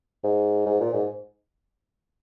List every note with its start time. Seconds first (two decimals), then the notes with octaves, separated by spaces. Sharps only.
0.24 G#2
0.66 G#2
0.80 A#2
0.93 G#2